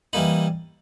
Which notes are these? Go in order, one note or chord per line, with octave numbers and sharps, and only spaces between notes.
E3 G3 A#3 D#4 B5